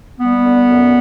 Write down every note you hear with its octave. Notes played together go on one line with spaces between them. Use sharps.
G3 B3
D3
F#2